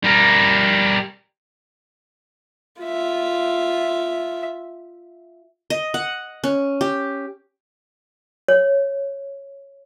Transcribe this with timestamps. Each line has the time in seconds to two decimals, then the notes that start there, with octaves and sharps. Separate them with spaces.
0.04 G3 A#4
2.83 F4 E5
5.70 D#5
5.94 F#5
6.44 C#4
6.81 G4
8.48 C#5